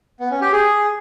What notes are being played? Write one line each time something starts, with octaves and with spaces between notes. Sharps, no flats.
B3
C#4
G4
G#4